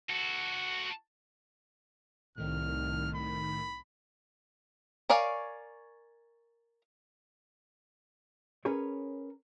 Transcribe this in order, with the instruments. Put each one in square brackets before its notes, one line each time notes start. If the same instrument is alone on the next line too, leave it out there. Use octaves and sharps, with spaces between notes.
[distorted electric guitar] F#4 A4
[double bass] C2 [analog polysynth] A2 D#3 [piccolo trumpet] F6
[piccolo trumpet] B5
[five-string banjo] A#4 C#5 D5 F5 G#5
[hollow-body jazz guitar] C#4 G#4 A#4 B4 C#5